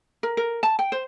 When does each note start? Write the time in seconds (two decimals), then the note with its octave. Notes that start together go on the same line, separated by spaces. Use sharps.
0.23 A#4
0.37 A#4
0.63 A5
0.79 G5
0.92 C5